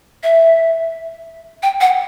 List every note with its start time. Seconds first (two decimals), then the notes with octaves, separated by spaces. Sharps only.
0.23 E5
1.63 G5
1.81 F#5